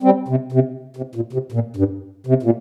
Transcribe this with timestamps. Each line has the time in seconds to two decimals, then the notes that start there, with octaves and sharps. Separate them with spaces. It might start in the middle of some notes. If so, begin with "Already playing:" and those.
0.03 G3 C4
0.28 C3
0.52 C3
0.96 C3
1.15 A#2
1.33 C3
1.52 A#2
1.76 G2
2.27 C3
2.43 A#2